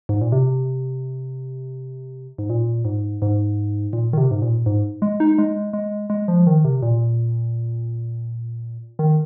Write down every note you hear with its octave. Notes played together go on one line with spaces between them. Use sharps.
G#2
A#2
C3
G#2
A#2
G#2
G#2
A#2
D#3
C3
G#2
A#2
G#2
G#3
D#4
G#3
G#3
G#3
F3
D#3
C3
A#2
D#3